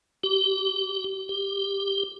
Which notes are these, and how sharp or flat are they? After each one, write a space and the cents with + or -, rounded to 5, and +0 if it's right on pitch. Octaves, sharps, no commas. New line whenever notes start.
G4 -30
G4 +10